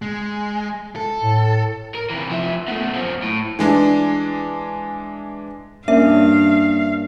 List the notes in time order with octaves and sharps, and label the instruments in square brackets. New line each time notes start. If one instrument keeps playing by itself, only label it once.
[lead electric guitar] G#3
A4
[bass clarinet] A2
[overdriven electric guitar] A#4
C3 E3
F3 E5
B2 A3
F#2 F3
A2
[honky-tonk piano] E3 G#3 D4
[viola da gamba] G2 [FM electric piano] A#3 C#4 D4 [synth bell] E5 [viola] F5